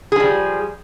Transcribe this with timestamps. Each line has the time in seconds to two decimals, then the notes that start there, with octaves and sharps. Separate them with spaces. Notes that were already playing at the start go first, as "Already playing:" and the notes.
0.12 G#4
0.16 F3
0.20 G3